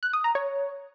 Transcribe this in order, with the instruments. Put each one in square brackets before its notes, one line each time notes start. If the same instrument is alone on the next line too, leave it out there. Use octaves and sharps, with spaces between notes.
[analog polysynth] F#6
D#6
A#5
C#5